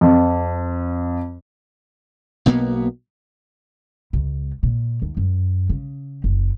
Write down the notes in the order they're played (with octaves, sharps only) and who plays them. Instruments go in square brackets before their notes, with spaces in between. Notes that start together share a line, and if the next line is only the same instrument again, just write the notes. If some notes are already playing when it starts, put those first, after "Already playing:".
[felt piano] F2
[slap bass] B1 B2 A#3 B3
[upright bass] C#2
A#2
D#2
F#2
C#3
F#1